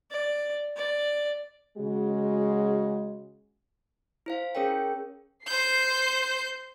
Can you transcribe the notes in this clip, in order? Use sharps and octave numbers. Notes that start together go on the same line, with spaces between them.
D5
D5
C#3 G#3 F#4
E4 C5 F5
C#4 G#4 A#4 C#5 G5
C5 G6 C7